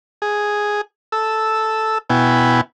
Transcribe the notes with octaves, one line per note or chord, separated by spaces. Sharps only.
G#4
A4 E6
B2 B3 E4 G5 G#5